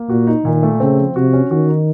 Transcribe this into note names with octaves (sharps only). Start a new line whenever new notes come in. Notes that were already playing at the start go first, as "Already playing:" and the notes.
Already playing: A#3
A#2 F#4
D#4
A#2 D#3
A3
C#3 C4
F3
C3 F#4
C#4
D#3 F#4
D#4